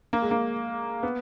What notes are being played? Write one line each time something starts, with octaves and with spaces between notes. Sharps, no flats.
A#3
G#3
A#3
B3